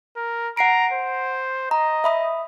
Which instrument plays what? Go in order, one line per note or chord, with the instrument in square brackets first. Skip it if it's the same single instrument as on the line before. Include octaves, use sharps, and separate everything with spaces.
[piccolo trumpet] A#4
[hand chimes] F#5 C7 D7 [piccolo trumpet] A#5
[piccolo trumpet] C5
[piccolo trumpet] D#5 [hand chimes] A#5
[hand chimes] E5 B5 D#6